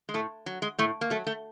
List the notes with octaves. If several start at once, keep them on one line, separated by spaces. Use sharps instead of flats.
G#3
A2 A3
F#3
G#3
A2 A3
A#3
F#3 A3
A3